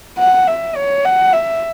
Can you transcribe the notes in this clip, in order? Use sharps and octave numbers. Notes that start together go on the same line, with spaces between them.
F#5
E5
C#5
F#5
E5